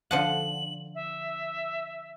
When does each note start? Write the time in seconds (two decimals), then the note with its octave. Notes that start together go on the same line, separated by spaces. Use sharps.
0.11 D3 F3 F#5 F#7
0.95 E5